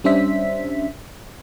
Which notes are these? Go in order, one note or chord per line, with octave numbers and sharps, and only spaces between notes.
G3 C#4 D4 C5 E5 B6